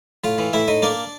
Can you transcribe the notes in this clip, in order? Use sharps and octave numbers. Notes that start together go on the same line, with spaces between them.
A2 F4 F5
E3
A2 E4 E5
A2 D#4 D#5
A#3 D4 D5